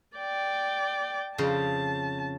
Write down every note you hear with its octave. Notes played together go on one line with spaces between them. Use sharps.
D5 G5
F2 C#3 C5 A5